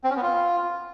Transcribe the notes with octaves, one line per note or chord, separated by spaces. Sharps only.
C4
C#4
B3
F4